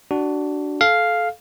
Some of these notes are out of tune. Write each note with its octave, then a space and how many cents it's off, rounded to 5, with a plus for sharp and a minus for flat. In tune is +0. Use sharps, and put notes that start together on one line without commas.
D4 +0 F#4 +20
A4 -25 F5 +0